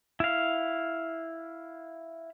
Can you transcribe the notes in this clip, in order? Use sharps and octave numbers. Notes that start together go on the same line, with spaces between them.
E4 F5